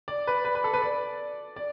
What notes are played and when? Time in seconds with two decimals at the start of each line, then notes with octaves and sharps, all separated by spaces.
0.08 D5
0.27 B4
0.45 B4
0.55 B4
0.64 A4
0.74 B4
0.82 D5
1.56 D5